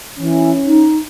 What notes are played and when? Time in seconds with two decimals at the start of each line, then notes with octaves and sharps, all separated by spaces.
0.18 E3 C#4
0.65 D#4